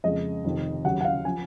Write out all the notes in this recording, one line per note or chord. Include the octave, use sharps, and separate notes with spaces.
F2 C#3 G#3 D#5
F1 F2 C3 D#3
D#2 C#3 F#3 F#5
F#5
F5
F3 G#5